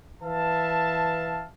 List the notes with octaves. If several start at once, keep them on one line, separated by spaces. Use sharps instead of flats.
E3 B4 E5 F5 A5